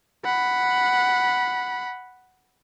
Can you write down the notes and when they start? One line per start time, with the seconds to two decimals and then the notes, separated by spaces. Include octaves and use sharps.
0.25 F#5 B5